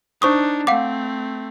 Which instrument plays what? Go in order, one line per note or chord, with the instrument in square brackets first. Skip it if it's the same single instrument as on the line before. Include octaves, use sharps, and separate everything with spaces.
[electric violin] D4 D#4 [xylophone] C5 C#6 D#6
[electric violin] A3 C4 [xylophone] F5 F#5 D6